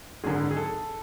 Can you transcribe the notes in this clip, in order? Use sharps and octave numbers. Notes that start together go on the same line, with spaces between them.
G#1 F#2 D3 G#4
G#4
A4